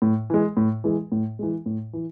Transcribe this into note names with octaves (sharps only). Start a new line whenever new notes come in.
A2
E3 G#3
A2
E3 G#3
A2
E3 G#3
A2
E3